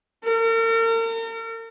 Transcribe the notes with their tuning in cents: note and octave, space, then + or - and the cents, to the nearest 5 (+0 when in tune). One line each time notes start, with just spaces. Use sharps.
A#4 -40